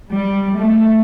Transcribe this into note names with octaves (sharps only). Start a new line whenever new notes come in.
G3
A3